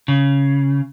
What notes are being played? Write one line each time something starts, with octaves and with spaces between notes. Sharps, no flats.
C#3